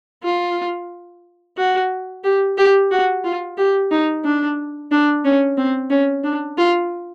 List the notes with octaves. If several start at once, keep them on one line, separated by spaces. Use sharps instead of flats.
F4
F#4
G4
G4
F#4
F4
G4
D#4
D4
D4
C#4
C4
C#4
D4
F4